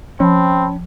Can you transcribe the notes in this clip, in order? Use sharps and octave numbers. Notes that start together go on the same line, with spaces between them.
F3 C4 C#4 G5 A5 B5